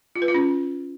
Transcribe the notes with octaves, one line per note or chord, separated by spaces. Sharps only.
F4
B4
F4
C#4